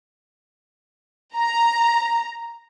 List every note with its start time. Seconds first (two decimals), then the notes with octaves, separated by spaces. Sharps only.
1.36 A#5